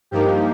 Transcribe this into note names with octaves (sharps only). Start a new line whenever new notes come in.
G2 F3 A#3 D#4 G4